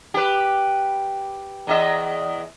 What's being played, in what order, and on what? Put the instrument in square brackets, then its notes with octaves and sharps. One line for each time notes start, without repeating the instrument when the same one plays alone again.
[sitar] G4 B4
E2 D#5 E5